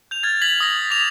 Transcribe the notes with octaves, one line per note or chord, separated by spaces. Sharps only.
G6 F7
F6 G#6 A6
G#6 B6 F#7
D#6 A#6
D6 B6 F7